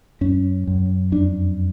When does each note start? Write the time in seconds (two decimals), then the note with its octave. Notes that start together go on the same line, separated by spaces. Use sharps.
0.21 F#2 C#4
0.67 F#2
1.12 F2 D4